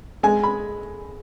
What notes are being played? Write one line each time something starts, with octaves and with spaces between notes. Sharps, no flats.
G#3 G#5
B5